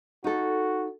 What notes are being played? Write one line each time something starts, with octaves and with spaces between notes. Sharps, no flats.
D#4 F#4 A4